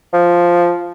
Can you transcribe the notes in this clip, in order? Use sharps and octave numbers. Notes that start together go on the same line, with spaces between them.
F3